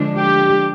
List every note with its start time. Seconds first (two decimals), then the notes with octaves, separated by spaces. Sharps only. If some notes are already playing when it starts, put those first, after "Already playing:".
Already playing: D3 F3 G#3 D4
0.17 G4